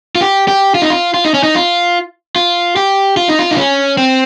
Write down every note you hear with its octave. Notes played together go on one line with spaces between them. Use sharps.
F4
G4
G4
F4
D#4
F4
F4
D#4
C#4
D#4
F4
F4
G4
F4
D#4
F4
D#4
C#4
C4